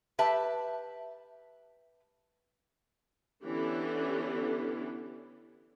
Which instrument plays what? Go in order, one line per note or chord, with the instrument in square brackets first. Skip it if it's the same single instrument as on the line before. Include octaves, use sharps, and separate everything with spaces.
[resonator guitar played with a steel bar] G4 B4 E5 A5
[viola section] D3 E3 B3 C#4 G4